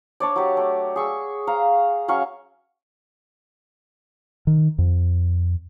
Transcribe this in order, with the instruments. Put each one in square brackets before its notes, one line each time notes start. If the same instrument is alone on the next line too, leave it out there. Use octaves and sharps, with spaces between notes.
[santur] D4 C#5 D5
F#3 G4
A3
G#4 C#6 E6
F5 A#5
F#3 C#4 F5 C#6
[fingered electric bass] D#3
F2